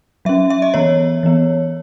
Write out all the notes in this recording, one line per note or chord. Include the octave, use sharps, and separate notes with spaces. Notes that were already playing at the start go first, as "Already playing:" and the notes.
F#3 C#4 E5
E5
D#5
E3 B3 C#5
E3 B3